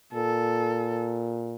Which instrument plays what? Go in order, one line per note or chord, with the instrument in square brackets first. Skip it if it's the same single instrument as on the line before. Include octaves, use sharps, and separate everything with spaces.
[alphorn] A#2 [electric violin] A4